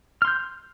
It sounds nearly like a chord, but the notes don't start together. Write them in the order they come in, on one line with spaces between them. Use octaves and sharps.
F6 C6 G6